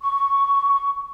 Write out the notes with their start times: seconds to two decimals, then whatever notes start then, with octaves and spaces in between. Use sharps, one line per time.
0.01 C#6